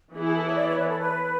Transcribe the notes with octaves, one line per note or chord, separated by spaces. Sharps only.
E3 B3 E4 G#4
G#4
A4
C#5
D5
C#5
B4
A4
B4